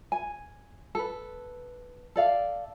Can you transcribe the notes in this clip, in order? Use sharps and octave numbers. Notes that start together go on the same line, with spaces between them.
G#5
A4 B4
A4 D5 F5